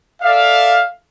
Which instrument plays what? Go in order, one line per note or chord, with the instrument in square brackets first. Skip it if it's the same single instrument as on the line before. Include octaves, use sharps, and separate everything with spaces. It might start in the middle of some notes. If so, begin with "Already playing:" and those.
[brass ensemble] A4 D5 E5 F5